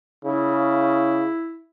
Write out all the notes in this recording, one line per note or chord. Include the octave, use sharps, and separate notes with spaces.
C#3 E4